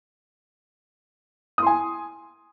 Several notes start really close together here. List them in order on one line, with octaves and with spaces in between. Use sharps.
D#6 C6 G#5